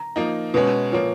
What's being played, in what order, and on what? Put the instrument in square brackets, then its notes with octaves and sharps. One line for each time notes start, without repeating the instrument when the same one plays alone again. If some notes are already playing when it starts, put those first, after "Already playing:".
Already playing: [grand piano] A#5
[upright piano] F3 A#3 D#4
[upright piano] B2 G#3 C#4 [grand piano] B4
[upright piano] A#2 F3 A#3 [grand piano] C#5